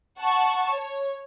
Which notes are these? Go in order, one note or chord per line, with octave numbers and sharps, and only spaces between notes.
F#5 A5 C#6
C#5